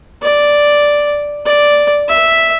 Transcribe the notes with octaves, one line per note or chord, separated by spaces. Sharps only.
D5
D5
E5